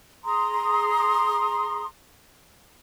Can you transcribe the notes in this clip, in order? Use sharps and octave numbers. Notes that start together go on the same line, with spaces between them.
G#4 A#5 C6 D#6